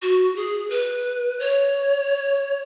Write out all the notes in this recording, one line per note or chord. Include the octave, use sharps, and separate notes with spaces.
F#4
G#4
B4
C#5